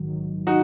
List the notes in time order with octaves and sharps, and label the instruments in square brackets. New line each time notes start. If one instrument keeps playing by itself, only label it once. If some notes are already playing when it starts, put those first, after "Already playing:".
Already playing: [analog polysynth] A#1 G#2 D#3 F#3
[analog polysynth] D#3 F#3 [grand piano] D#4 F#4